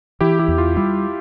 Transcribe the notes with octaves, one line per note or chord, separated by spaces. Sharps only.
E3 E4 G4
E4 G4
E2
F4
G3 E4